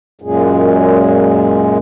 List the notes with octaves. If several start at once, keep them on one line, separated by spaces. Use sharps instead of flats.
F#2 A#2 G#3